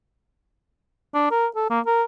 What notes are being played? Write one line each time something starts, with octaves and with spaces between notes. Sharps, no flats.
D4
A#4
A4
A#3
A#4